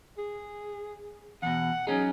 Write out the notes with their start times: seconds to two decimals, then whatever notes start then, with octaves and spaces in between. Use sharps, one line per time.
0.18 G#4
1.42 E2 B2 F#5
1.87 F#3 C#4 D#4 G#4